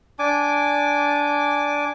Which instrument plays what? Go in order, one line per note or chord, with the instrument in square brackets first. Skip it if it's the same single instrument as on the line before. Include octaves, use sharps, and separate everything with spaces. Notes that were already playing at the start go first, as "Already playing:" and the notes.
[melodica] D4 G#5 D6